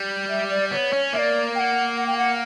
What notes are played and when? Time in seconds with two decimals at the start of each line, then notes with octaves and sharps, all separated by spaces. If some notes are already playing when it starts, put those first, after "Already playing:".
Already playing: G3
0.29 E5
0.50 D5
0.71 B3 D5
0.75 C#5
0.93 C#4
1.13 A#3 E5
1.18 D5
1.55 G5
1.59 F#5
1.97 F#5
2.07 G5
2.18 F#5